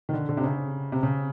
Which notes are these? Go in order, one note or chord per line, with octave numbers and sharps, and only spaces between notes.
D#3
D3
D3
C3
C#3
C3
C#3